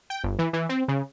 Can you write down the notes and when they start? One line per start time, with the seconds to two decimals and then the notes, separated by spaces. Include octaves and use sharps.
0.10 G5
0.24 G1
0.39 E3
0.53 E3
0.69 C4
0.88 C#3